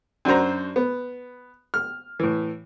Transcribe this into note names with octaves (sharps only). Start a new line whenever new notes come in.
F#2 D4 F#4 C5 A#5
B3
F6
A2 E3